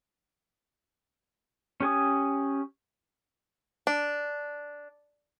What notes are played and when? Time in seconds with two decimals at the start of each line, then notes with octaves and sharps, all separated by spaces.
1.80 C#4 G4 G#5 D#6
3.87 D4